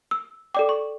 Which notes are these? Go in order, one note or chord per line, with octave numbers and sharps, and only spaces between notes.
E6
A4 D5 G5 D6
C#6